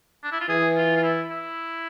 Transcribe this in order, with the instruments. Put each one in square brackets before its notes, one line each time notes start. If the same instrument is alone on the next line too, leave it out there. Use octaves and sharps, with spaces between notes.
[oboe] D4
E4
F4
[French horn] E3 [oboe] G#4
[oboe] F4
F4
E4
E4